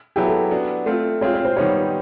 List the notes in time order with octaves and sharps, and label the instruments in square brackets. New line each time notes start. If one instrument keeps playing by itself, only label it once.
[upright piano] F#3 B3 E4 G4 [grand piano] G#4
[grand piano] A4
[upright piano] B3 D4 F#4
A3 C4 F4
[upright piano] G#3 C4 F4 G#4 [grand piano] C#5
[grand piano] C#5
C5
[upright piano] D#3 G3 B3 D#4 G4 [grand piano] C#5